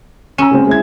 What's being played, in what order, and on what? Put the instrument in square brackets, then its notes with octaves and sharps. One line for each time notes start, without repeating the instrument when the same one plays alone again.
[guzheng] C#4 [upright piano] A#5 E6 E7
[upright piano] C#3 G#3 C4
G#3 E4 G#6